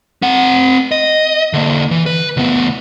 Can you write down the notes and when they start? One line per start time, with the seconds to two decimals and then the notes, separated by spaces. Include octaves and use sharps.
0.22 C4 F#5
0.92 D#5
1.53 D3 A#3
1.91 E3
2.06 B4
2.37 D2 B3